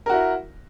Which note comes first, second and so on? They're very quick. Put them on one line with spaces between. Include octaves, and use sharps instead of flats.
A#4 F#4 E4